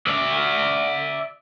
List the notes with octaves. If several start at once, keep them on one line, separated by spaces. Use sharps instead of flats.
D5 E5